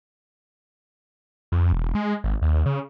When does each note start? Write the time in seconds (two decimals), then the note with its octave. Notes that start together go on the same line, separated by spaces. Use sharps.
1.52 F2
1.73 E1
1.95 G#3
2.24 G#1
2.42 D#2
2.66 C#3